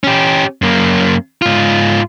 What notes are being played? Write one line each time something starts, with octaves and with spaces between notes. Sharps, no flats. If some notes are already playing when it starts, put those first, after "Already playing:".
C#4 G4
F#2 A#3
G#2 F4